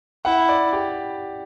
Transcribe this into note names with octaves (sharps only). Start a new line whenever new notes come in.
E4 F#5
D5
G4